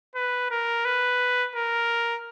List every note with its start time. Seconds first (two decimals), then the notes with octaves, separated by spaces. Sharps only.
0.15 B4
0.51 A#4
0.85 B4
1.55 A#4